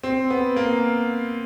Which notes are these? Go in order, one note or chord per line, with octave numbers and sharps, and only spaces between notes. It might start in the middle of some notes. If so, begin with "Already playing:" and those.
C4
B3
A#3